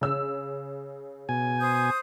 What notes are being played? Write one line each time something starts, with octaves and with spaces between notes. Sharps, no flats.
C#3 E6
B2 G#5
C5 D#6 G6